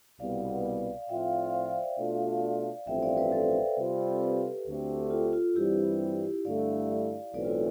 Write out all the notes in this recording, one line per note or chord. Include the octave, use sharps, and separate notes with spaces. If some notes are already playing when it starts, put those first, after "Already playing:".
C2 B2 G3 B3 D5 F5
F5
A2 F3 C4 F4 E5 G5
D5 F5
F5
C5 E5
D5 F5
D5 F5
B2 A3 D4 F4
A1 G2 F3 A3 C4 E5 G5
D5 F5
B4 D5
A4 C5
C3 G3 C4 F4
A4
G4 B4
D2 D3 A3 C4 G4
F4 A4
F4
G2 E3 G3 C4 E4 G4
G2 D3 A3 E4 D5 F5
B1 A2 E3 A3 C4 B4 D5
F4
E4